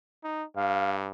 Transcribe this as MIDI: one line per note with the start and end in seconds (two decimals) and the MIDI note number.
0.24 0.44 63
0.56 1.12 43
0.56 0.93 77